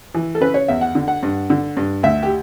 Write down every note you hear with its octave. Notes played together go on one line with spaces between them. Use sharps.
E3
A4
C#3 B4
C#5
E2 E5
F#5
D3
F#5
G2
D3
G2
D2 E5
G4